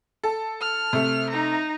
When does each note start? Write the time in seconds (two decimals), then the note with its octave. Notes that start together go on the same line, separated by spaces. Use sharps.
0.24 A4
0.61 F6
0.93 C3 A3
1.30 D#4 A#5